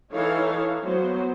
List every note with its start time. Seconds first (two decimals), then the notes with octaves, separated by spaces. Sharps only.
0.11 E3 D#4 A4 C#5 F5
0.83 F#3 B3 C5